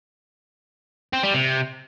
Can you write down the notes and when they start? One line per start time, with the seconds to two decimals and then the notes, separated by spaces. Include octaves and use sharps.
1.13 C4
1.23 G3
1.33 C3